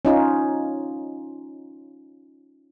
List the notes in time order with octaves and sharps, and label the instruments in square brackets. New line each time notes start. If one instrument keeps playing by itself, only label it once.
[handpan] C#4 D#4 F4